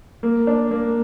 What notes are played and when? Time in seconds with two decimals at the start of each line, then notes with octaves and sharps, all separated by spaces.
0.23 A#3
0.47 D4
0.71 A#3